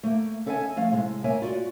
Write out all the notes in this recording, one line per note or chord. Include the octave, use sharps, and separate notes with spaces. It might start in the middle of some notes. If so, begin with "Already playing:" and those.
A3 A#3
C#4 A4 D#5 E5 F#5 G#5
F3 A3 F5
A2 C3 G#3
A#3 C#5 E5 G#5
F4 F#4 D5